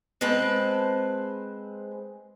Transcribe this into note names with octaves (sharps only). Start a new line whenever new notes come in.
G#3 C4 B4 A5